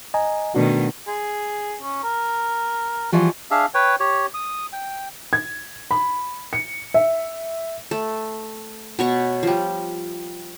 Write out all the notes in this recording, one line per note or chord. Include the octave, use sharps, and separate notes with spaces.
D#5 G#5 A#5
B2 D#3 A3 D4 F#4
G#4
C#4
A#4
E3 F3 G3 F#4
D4 G#4 E5 F5
B4 C#5 G5
G4 C#5
D#6
G5
G#6
B5
C#7
E5
A3
B2 C#5 C#6
F3 G3